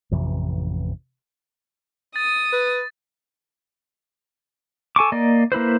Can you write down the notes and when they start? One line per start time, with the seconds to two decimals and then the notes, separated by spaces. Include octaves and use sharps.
0.11 A1 F2 C3 E3
2.16 D#6 A6
2.53 B4
4.96 A4 G#5 C#6 D6
5.12 A#3 D5 D#5
5.52 A#3 E4 B4 C5